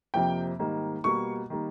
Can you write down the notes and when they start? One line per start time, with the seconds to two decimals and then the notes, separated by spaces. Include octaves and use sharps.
0.14 F2 C3 F3 A#3 G5
0.59 G#2 D#3 G3 A#3
1.04 B2 G3 A#3 C#6
1.50 D#3 G3 A#3